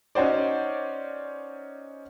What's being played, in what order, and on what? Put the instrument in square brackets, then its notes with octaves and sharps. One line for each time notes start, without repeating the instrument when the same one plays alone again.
[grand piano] C#4 D#4 F#4 C5 D5